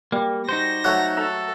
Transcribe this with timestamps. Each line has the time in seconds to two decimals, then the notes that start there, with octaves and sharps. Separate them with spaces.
0.12 G3 A#3
0.49 D#4 F#4 C5 A#6
0.84 F#3 A3 C#5 E5 F#5
1.17 A4 E5 A#5